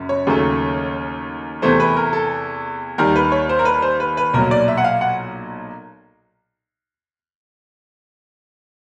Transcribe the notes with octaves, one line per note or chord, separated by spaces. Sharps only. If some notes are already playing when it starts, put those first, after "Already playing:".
Already playing: F#1 F#2
C#5
D#2 C#3 F#3 A3
E2 C3 E3 A3 C5
B4
A#4
A4
D#2 D#3 G3 A#4
B4
C#5
C5
A#4
B4
C5
B4
B4
B1 A#2 F#3 A#4
D5
E5
F#5
F5
F#5